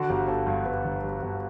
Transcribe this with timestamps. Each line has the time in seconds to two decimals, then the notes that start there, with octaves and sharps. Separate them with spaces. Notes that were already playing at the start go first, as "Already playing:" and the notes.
Already playing: D3 F#4
0.09 G1 G4
0.28 G1 A4
0.47 G2
0.66 G2 B4
0.85 G1
1.04 G2
1.22 G1